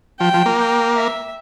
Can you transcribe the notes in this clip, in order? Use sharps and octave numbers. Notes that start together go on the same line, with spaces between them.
F3 G5
F3
A#3
G5
E5